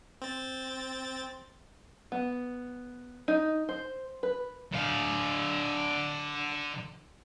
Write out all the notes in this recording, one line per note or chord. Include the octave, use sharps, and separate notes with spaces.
C4 A6
B3
D#4
C5
B4
D3 F5